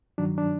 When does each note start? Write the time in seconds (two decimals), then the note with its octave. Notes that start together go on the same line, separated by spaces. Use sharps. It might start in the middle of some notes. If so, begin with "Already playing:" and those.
0.18 G2 D#3 F#3 D4
0.38 D4